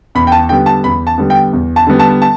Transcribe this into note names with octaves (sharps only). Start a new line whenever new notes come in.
E2 B5
G5
A5
D3 G3 B3 G5
A5
E2 B5
A5
D3 G3 B3
G5
E2
A5
D3 G3 B3
A5
A5